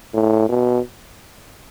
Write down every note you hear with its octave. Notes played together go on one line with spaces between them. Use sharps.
A2
B2